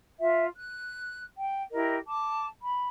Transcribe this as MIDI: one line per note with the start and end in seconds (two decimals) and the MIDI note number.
0.19 0.45 65
0.19 0.45 76
0.56 1.23 90
1.38 1.61 79
1.73 1.97 64
1.73 1.97 67
1.73 1.97 70
1.73 1.97 75
2.07 2.46 81
2.07 2.46 86
2.61 2.88 83